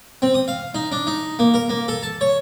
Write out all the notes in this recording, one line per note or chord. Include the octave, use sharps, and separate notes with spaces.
C4
D#6
F5
D#4
D4
D#4
A#3
A#4
A#3
A4
A5
C#5